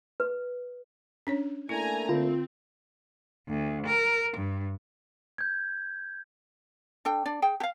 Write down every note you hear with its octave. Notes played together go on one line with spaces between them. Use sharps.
B4
C#4 D4 C#5
A3 A#3 D4 E4 G#5 A#5
D3 C4 F4
D2
A#4
G2
G6 G#6
D4 A4 G5
D4 D5
G#4 G5
G4 F5